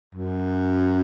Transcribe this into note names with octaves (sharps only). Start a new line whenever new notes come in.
F#2